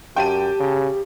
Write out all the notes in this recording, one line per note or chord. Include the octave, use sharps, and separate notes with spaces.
F#2 G4 G5 A5 D#7
C#3